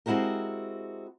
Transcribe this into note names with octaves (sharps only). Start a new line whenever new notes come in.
G#3 C4 E4 F#4 G4 A#4